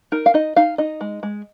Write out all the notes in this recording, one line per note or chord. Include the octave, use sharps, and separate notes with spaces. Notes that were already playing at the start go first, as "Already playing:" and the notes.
D#4 A#4
F5
D#4 D#5
D#4 F5
D#4 D#5
G#3
G#3